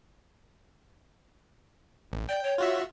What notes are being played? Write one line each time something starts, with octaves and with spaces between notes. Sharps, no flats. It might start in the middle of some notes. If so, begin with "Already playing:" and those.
A1
D5 G5
C#5
F4 F#4 E5